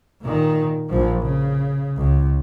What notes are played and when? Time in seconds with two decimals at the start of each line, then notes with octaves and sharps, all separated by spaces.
0.22 A#2 D#3
0.89 A#1 F3
1.20 C#3
1.97 C#2